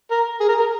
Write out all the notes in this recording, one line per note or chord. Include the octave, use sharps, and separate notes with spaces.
A#4
G#4
A#4
A#4